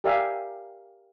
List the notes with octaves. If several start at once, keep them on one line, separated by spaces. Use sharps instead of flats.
G4 A#4 D5 E5 F5 G#5